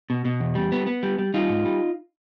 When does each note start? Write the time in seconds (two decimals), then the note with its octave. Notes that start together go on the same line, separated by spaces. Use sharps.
0.10 B2
0.25 B2
0.40 E2
0.55 G3
0.72 B3
0.87 B3
1.03 G3
1.19 G3
1.34 G3 D#4 F4
1.49 G#2
1.65 G3